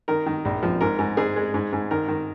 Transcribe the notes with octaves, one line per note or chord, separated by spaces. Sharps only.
D#3 A#4
D#3
A#1
F3
G#2 A#4
G#2
G#2 G#4
G#3
G#2
G#2
D#3 A#4
D#3